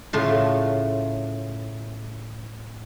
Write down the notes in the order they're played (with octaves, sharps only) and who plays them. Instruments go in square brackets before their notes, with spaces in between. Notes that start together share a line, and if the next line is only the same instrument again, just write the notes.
[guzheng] A2 C#3 A3 F4